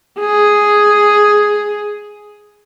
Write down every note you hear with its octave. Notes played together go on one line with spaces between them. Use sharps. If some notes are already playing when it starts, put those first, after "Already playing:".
G#4